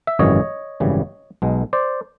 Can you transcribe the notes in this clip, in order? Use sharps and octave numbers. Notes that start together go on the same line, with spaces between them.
E5
G#1 F#2 C#3 E3 G3 C#5 D#5
G#1 F#2 C#3 E3 G3
B1 B2 G#3
C5 D5